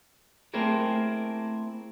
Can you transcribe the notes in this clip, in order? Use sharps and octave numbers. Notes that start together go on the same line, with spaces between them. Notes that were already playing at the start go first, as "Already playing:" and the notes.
A3 A#3 C4 E4 G#4 A#4